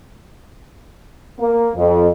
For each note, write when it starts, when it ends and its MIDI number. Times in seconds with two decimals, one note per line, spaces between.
1.40 1.70 58
1.76 2.09 41